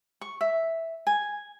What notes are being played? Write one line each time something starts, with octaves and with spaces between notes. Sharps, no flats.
C#6
E5
G#5